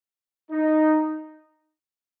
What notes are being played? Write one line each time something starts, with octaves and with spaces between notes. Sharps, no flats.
D#4